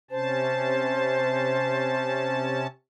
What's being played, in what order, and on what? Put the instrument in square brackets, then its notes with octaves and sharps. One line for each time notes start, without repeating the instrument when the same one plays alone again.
[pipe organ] C3 C#4 A5 [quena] C5